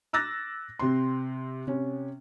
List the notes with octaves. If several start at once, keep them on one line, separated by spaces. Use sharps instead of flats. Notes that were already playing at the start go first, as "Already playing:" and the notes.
D6 E6 F#6 A6 A#6
C3 C4 C6
C3 C#4